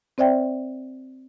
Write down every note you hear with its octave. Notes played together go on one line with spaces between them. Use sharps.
C4 C5 D5 E5 G5